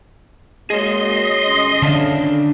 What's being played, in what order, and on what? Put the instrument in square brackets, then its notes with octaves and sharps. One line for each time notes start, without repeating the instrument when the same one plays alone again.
[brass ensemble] G#3 A#3 F#4 [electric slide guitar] G#4 C#5 [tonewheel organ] D#5 C6
[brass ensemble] G1 C#4
[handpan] D3 D#3 [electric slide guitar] D4 E5 F5